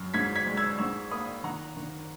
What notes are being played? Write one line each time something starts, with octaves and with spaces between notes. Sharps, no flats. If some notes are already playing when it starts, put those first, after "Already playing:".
Already playing: F#2 F#3
G#2 G#6 B6
G#6 B6
G#3
E6 G#6
G#2 C#6 E6
A#3 B5 D#6
D#3 F#5 A#5
D#3